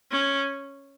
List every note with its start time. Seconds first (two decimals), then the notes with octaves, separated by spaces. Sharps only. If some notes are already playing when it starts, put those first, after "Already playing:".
0.12 C#4